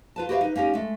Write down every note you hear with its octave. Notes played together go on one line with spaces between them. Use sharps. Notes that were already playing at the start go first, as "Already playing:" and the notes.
F4 B4 A5
F#4 G4 B4 C#5 E5 F5
D#4 B4
A#3 C#4 D#4 G4
G#3 A3